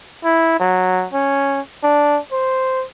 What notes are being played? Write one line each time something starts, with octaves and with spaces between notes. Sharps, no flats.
E4
F#3
C#4
D4
C5